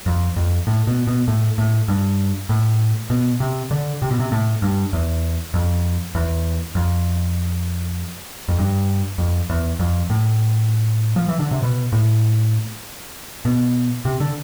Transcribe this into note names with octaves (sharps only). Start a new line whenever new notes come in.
F2
F2
A2
B2
B2
A2
A2
G2
A2
B2
C3
D3
C3
B2
C3
A2
G2
E2
F2
E2
F2
F2
G2
F2
E2
F2
A2
F3
E3
D3
C3
B2
A2
B2
C3
D3